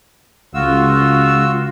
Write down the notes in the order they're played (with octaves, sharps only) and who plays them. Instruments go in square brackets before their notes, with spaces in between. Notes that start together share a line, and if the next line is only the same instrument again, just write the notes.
[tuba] C#2 [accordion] F4 F#4 E6